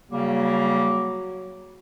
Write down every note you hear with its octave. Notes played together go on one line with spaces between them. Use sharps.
C#3 F#3 G3 A#3